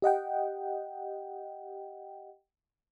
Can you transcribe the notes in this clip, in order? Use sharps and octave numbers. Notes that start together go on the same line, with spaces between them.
G4 D#5 F#5 G5